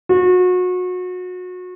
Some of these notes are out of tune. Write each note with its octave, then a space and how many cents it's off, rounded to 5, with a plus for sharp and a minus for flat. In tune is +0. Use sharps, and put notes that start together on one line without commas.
F#4 -30